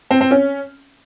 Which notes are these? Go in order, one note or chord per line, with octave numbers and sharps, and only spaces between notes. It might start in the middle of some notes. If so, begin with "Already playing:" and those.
C4
C4
C#4